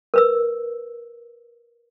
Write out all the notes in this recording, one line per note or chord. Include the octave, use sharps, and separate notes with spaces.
A#4 B4 E6